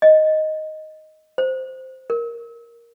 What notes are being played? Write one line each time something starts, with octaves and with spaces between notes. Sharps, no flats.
D#5
C5
A#4